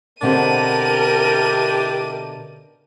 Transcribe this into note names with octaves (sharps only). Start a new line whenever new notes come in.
B2 D3 C4 D4 E4 G4 A#4 D#7